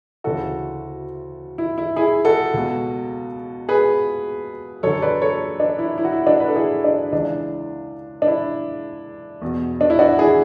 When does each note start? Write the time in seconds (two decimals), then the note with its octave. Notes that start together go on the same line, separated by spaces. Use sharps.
0.24 D2 C#3 E3 F#4 A4
1.58 E4
1.78 E4
1.96 E4 G#4
2.25 F#4 A4
2.54 C#2 B2
3.69 G#4 B4
4.83 F#2 D3 A4 C#5
5.02 B4 D5
5.21 A4 C#5
5.60 D4
5.79 E4
5.98 E4
6.05 F#4
6.12 E4
6.26 D4 F#4
6.40 B4
6.48 A4
6.55 E4 G#4
6.84 D4
7.12 C#2 C#3 E3 D4
8.22 D4
8.27 E4
9.42 E2 B2
9.81 D4
9.90 E4
9.99 D4 F#4
10.18 E4 G#4